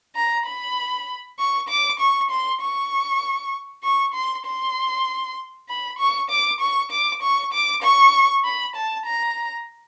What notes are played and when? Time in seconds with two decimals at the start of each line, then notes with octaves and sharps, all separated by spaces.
0.16 A#5
0.46 B5
1.39 C#6
1.69 D6
2.00 C#6
2.30 C6
2.62 C#6
3.84 C#6
4.14 C6
4.46 C6
5.69 B5
5.99 C#6
6.30 D6
6.61 C#6
6.91 D6
7.23 C#6
7.53 D6
7.83 C#6
8.44 B5
8.76 A5
9.06 A#5